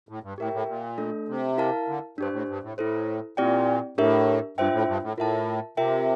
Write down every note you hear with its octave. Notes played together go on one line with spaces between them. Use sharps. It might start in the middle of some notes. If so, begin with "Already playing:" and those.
A2
G2
A2 G4 A#4 E5 G5
A2
A#2
A3 D4 A4
C3
E4 A#4 F5 A5
D3
G2 D4 G4 C5
A2
G2
A2
A2 E4 A4 C5
A#2 C4 E4 G4 D5 G5
A2 D4 G4 A#4 E5
G2 D4 F4 C5 E5 G5
A2
G2
A2
A2 F4 A#4 E5 A5
C3 F4 A#4 E5 G5